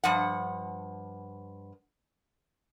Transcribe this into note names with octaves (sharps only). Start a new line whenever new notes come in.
G2 F3 F#5